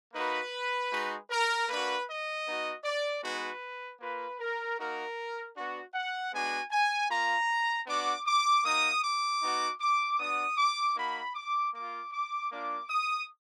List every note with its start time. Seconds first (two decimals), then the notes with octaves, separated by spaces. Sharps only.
0.13 A#3 D#4 F#4 B4
0.92 G#3 D#4 F#4
1.30 A#4
1.69 A#3 D4 F#4 B4
2.07 D#5
2.46 B3 D#4 F#4
2.84 D5
3.23 G#3 B3 D#4 F#4 B4
4.00 A#3 F4 B4
4.40 A#4
4.78 A#3 D#4 F#4 A#4
5.56 B3 D4 F#4
5.94 F#5
6.33 G#3 B3 D4 F#4 G#5
6.71 G#5
7.09 A#3 F4 A#5
7.87 B3 D4 F#4 D6
8.26 D6
8.64 A#3 D#4 F#4 D#6
9.03 D6
9.42 B3 D#4 F#4
9.81 D6
10.19 B3 D4 F#4 D#6
10.57 D6
10.96 A#3 D#4 F#4 B5
11.35 D6
11.74 A#3 F4 D6
12.12 D6
12.51 A#3 D4 F4 D6
12.90 D#6